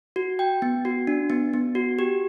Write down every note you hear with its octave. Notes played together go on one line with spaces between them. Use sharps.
F#4
G5
B3
F#4
D4
B3
B3
F#4
G4